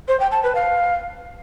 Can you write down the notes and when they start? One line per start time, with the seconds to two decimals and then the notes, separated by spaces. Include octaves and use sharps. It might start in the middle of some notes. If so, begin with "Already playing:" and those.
0.08 C5
0.20 G5
0.32 A5
0.43 B4
0.55 F5